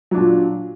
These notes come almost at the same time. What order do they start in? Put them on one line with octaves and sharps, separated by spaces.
F#3 D4 A#2